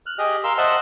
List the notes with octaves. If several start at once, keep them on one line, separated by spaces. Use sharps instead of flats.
F6 F#6
G4 G#4 D#5
A#4 F5 C6 E6
C5 D#5 E5 F#5 A5